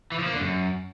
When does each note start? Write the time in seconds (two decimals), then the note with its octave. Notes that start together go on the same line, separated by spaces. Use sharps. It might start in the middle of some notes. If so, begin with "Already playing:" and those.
0.12 E3
0.19 F3
0.26 A#3
0.33 D3
0.40 F#2